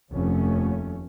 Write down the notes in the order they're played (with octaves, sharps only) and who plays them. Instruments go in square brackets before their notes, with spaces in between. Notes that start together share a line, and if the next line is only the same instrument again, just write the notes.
[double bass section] F1 D#2 A3 C#4